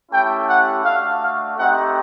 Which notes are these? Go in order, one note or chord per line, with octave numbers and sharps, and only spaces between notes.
A3 C#4 E4 G4 G5
F#5
A3 D4 F#4 F5
F5
A3 C4 D#4 G4 F#5